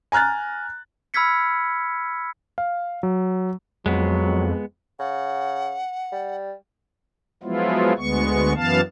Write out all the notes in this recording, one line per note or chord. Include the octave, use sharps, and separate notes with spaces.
G#5 A#5 F6 F#6 A6
B5 E6 F6 G#6 B6 C#7
F5
F#3
F2 F#3 G#3 B3
C#3 F#5
G3
F3 F#3 G#3 B3 E4 F4
D2 G#3 B3 C#6
F#2 E3 B3 F5 A5